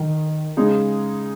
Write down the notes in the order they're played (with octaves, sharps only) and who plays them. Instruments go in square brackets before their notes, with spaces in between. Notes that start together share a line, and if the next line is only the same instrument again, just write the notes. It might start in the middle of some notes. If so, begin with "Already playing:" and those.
Already playing: [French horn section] D#3
[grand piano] C#3 G#3 D#4 G#4